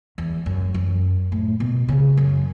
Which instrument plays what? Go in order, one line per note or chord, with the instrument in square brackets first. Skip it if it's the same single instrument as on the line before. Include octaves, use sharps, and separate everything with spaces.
[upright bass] E2
F#2
F#2
A2
B2
C#3
F#2